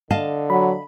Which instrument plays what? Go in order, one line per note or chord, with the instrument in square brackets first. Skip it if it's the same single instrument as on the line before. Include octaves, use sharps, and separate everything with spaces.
[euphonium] D3 [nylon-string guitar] D#5 F5 A5
[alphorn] F#3 [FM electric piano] B5